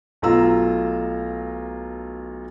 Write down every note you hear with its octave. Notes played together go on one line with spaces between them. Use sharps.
B1 A3 F4 A#5 E6